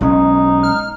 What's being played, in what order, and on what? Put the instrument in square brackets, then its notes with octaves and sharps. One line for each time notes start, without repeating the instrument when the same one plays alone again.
[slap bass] B1 G#3 C#4 [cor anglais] D#4
[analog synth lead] F6